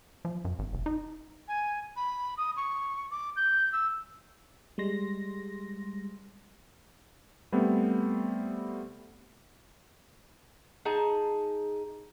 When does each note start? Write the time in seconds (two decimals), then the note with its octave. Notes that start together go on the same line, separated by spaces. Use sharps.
0.25 F3
0.45 F#2
0.59 G#1
0.74 F1
0.86 D#4
1.48 G#5
1.96 B5
2.37 D#6
2.57 C#6
3.11 D6
3.36 G6
3.73 E6
4.78 G3 G#3 C6 A#6
7.52 G3 A3 B3 C4
10.85 D#4 G#4 A5